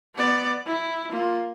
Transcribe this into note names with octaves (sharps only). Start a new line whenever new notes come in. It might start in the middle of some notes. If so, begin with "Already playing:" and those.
B3 D5
E4
A#3 F4